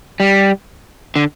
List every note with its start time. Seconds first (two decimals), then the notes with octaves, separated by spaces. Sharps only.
0.20 G3
1.16 D3